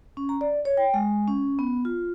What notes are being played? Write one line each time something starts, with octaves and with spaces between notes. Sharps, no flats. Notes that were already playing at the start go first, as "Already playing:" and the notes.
C#4
A#5
D5
C#5
G5
G#3
C#4
B3
F4